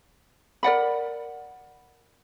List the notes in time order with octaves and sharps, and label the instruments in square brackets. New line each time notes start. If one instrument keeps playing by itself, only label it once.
[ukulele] A#4 D5 F#5 B5